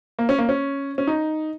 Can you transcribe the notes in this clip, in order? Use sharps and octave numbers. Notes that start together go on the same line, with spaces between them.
A#3
C#4
A#3
C#4
C#4
D#4